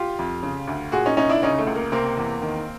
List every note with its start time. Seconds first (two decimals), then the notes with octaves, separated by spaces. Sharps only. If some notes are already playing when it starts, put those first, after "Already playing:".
Already playing: F4 G4
0.19 F2
0.43 C#3
0.67 D2
0.92 A#2 F#4 G#4
1.06 C#4 D#4
1.17 C2 C#4 D#4
1.29 D4 E4
1.42 C#3 C#4 D#4
1.59 A3
1.67 C#2
1.75 A#3
1.92 C3 A#3 C4
2.17 E2
2.41 D#3